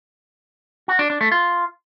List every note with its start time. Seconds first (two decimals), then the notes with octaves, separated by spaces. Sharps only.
0.88 F#4
0.99 D4
1.10 D4
1.21 A3
1.32 F4